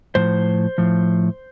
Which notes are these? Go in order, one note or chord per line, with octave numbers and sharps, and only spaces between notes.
A2 F3 C5
A2 F3